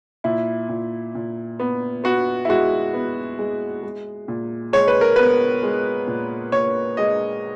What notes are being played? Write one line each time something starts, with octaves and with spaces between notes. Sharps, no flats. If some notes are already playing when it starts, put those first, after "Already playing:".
A#2 E4
A#2
A#2
B3
B3 F#4
E4
G#3 F#4
B3
G#3
G#3
A#2
G#3 C#5
B4
A#4
B3 B4
G#3
A#2
A#2 C#5
G#3 D#5